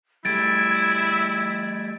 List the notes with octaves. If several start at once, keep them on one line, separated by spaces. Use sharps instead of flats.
G3 A3 E4 G#6 A6 D7